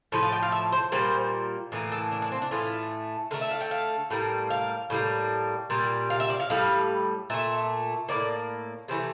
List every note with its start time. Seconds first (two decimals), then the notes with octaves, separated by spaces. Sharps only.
0.12 A2 F3
0.23 F5
0.32 G5
0.42 F5
0.52 E5
0.72 C5
0.92 A#2 G3 A#3 C5
1.72 A2 E3 A#3
1.92 A4
2.12 D4
2.22 D4
2.32 C4
2.42 D4
2.51 A2 E3 A3 F4
3.31 D3 A3 A#4
3.41 E5
3.51 F5
3.61 G5
3.71 F5
4.10 A2 G3 A#3
4.50 F5
4.90 A2 G3 A#3
5.70 A#2 G3 A#3
6.10 F5
6.20 E5
6.30 D5
6.40 F5
6.50 A2 G3 F5
7.30 A#2 A3 E5
8.09 A2 E3 A#3 D5
8.88 C3 E3 A3 C5